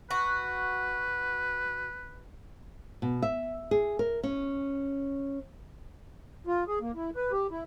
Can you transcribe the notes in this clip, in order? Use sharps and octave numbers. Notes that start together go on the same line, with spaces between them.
F#4 B4
B2
E5
G#4
A#4
C#4
F4
G#4
A#3
E4
B4
G4
E4